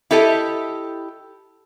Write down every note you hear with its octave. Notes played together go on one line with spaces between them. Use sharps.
E4 G4 A4 D#5